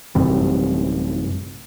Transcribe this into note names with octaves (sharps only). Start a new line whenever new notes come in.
A1 F#2 C3 G3